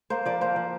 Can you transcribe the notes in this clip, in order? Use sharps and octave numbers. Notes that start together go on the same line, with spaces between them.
A#3 C5
F3 D5
A#3 C5
F3